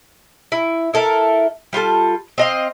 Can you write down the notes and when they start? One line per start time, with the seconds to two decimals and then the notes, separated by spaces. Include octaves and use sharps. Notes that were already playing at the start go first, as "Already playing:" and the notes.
0.52 E4
0.94 E4 A4 A#4 E5
1.73 G3 F4 G4 A4
2.38 C4 D#5 F5